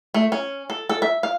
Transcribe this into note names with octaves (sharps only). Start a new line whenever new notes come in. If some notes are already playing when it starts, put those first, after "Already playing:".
A3
C#4
A4
A4
E5
F5